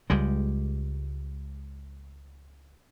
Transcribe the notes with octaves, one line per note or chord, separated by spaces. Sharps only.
C#2 G3 G#3